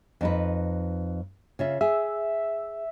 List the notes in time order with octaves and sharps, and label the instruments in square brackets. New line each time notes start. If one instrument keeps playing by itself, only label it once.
[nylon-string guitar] F2 D#4 B4
C#3 F4 E5
[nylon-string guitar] G#4 [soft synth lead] E5